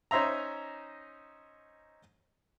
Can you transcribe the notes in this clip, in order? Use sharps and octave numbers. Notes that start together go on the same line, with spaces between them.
C#4 D#4 C5 E5 A#5